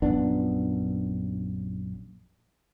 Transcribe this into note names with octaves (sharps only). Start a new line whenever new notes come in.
A#1 F#2 B3 D4